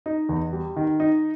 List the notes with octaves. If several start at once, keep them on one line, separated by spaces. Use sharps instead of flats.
D#4
E2
G3
D#3
D#4